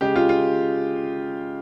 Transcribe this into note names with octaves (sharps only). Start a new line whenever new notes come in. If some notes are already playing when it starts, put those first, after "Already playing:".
C#3 G#3 G4
F4
F4